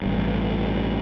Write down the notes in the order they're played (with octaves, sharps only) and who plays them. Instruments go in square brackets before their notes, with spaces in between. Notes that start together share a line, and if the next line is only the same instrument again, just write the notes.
[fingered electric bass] A1 G2